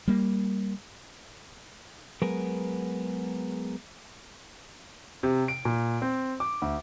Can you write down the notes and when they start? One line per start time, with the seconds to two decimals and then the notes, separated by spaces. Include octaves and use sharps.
0.08 G3 A#3
2.22 F#3 G#3 B3 G#4 A#4 B4
5.23 C3
5.48 D7
5.65 A#2
6.02 C4
6.40 D6
6.62 D2